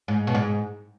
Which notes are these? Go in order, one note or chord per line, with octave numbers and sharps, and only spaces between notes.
G#2
B2
G#2